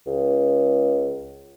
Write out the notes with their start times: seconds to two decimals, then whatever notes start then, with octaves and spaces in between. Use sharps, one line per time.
0.07 C#2